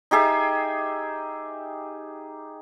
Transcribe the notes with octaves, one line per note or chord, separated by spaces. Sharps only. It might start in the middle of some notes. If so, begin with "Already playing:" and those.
D#4 G4 G#4 E5